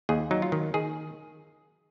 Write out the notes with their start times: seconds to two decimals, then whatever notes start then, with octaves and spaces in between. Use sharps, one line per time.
0.09 D#2 G#4
0.31 F#3 D#4
0.42 F4
0.52 D#3
0.74 D#3 G#4